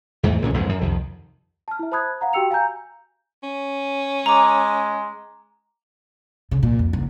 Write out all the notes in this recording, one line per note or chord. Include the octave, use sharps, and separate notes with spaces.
E2 G#2 E3 A3
C#2 A#2 D3 C#4
A1 F2 G#2 G#3
F#2
C2 F2 D#3
A5 F6
E4 E5
C5 A5 B5 D#6 F#6 G#6
F5 F#5 A#5
F#4 G4 G5 E6 C#7 F7
F5 G#5 A#5 G6
C#4
G#3 A#5 D6
C#3
A#2
F2
F#1